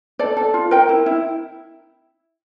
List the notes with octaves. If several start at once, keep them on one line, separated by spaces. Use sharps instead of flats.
A4 D5
A4
F4
A#4 G5
E4
E4